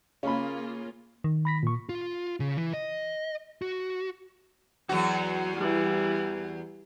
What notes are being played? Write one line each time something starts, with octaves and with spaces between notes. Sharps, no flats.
C#3 A#3 C#4 F4 G#4 B5
D#3
B5 A#6 B6
A#2 C#6
F4
C#3
E3
D#5
F#4
E2 F#3 F#4
E3 G3